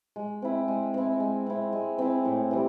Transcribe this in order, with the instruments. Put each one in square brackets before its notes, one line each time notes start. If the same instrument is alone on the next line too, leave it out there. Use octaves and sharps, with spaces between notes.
[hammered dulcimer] G#3
C4 E4
G#3
C4 E4
G#3
C4 E4
G#3
C4 E4
A2
E3 G3